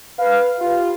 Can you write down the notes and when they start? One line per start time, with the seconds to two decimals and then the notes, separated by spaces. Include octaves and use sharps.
0.19 B4 F5
0.60 F4 G4 B4 F5